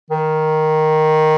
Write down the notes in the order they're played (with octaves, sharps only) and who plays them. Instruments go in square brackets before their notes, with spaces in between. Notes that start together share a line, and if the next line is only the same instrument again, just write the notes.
[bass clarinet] D#3